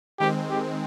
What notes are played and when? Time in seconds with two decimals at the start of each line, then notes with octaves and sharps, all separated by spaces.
0.20 D#3 G#3 C4 G4
0.50 G4